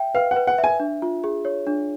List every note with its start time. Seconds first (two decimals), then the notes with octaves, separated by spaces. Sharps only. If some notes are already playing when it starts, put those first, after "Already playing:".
Already playing: E5 G5
0.15 B4 F5
0.31 F#5
0.36 B4
0.47 F#5
0.58 E5
0.64 G#5
0.80 D4
1.02 F4
1.24 G#4
1.45 C#5
1.67 D4